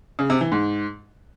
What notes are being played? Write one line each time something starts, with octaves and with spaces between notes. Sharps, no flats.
C#3
C3
E3
G#2